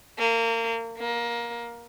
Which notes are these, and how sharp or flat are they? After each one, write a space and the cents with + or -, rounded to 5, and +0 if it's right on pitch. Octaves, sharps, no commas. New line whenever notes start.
A#3 -30
A#3 +20